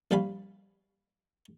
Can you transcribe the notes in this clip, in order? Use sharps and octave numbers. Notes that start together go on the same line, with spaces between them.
A#1 G3 F5 G#5 B5